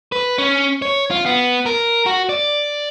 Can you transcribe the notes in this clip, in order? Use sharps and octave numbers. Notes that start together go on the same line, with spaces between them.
B4
C#4
C#5
F4
B3
A#4
F#4
D5